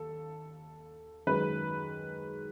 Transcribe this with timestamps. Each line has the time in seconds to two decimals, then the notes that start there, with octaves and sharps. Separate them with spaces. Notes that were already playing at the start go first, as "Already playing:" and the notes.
Already playing: D#2 A4
1.27 F#2 D#3 G#3 B4